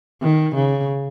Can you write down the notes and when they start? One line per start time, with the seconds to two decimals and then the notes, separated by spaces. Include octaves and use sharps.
0.22 D#3
0.55 C#3